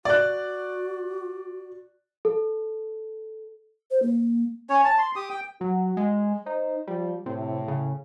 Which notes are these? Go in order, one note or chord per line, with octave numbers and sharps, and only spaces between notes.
F#4 D5 F#6
A4
C5
A#3
C#4 C#5
A5
C6
G4 D#6
G5
F#3 F#4
G#3
D#4 C5
F3 G3
A2 C3
C#3